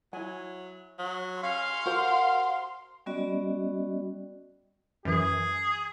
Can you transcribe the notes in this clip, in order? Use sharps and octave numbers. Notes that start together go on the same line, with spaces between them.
F#3 E4 G#5
F#3
C#4 F5 C6
F#4 A#4 C5 F#5
G3 B3 C#4 F#4 D5 D#5
F#2 E3 G#4